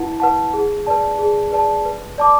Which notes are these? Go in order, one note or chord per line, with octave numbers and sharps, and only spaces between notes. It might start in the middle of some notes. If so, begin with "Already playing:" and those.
Already playing: E4 B4 F#5 A5
B4 F#5 A5
G#4
B4 D5 A5
G#4
B4 D5 A5
B4
D5 A5 D6